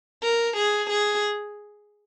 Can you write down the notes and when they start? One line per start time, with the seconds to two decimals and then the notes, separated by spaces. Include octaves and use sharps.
0.23 A#4
0.57 G#4
0.90 G#4